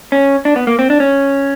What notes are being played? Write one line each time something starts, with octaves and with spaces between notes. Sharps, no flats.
C#4
D4
B3
A#3
C4
D4
C#4